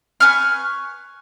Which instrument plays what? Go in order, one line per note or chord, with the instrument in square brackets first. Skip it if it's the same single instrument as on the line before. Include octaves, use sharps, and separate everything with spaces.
[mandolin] B4 G#5 C#6 F6